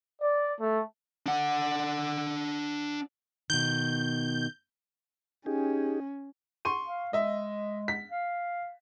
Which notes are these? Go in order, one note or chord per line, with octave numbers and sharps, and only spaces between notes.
D5
A3
D4 F#5
B2 D#3 G6
C#4 D#4 G4 G#4
C6 C#6 D#7
F5
G#3 D#5 E5
B6
F5